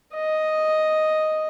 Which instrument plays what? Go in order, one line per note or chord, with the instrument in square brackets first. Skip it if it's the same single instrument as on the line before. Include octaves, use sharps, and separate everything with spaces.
[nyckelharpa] D#5